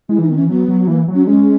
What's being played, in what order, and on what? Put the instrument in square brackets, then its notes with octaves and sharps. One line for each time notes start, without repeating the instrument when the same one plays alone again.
[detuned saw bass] G#3 [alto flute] E4
[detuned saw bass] E3 [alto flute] D#4
[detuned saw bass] D#3 [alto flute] B3
[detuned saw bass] E3 [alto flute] C#4
[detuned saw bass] F#3 [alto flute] B3
[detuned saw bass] F#3
[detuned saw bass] E3 [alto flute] A#3
[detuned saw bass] F#3
[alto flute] C#4
[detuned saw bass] G#3 [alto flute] C#4